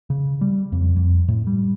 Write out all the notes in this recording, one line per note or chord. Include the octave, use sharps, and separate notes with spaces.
C#3
G3
F2
F2
A2
G3